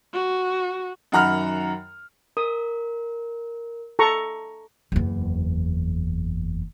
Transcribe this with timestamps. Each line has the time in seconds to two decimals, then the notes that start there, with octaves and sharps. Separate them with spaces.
0.14 F#4
1.12 F#2 D#3 F#5 A#5 B5 F6
2.37 A#4 D#6
3.99 A4 A#5 C#6
4.92 F#1 E2